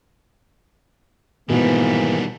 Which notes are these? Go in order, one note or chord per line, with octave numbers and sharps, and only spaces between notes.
G#2 B2 D#3 E3 G3 A#3